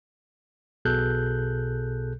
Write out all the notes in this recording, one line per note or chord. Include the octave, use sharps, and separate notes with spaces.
B1 B2 G#4 A4 F#6 G6